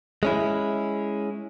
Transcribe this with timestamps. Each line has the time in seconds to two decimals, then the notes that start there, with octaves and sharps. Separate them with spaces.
0.23 G#3 C#4 E4